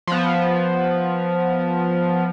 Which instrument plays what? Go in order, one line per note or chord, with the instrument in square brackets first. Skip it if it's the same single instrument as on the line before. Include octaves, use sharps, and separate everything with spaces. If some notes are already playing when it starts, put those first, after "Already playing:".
[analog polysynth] F3 B3